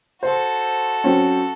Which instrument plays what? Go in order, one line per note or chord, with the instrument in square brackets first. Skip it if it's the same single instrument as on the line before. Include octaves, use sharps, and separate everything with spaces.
[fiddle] F#4 A4 [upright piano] C5
[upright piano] F#3 C4 C#4